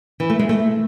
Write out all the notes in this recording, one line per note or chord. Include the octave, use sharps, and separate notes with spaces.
E3
A3
G#3
A3